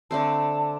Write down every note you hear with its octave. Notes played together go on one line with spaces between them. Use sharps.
D3 A3 C4 A5